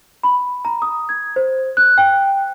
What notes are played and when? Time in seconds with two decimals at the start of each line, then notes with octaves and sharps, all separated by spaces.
0.23 B5
0.65 A#5
0.82 D#6
1.09 G#6
1.36 C5
1.77 F#6
1.98 G5